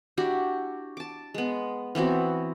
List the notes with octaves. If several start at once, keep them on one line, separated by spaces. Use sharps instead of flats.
D4 E4 F#4 G4
A5 D6
G#3 B3
E3 B3 C4 F#4